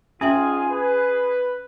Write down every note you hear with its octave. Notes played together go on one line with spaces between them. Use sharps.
G#2 C#4 F4 G#4 E5 G5
B4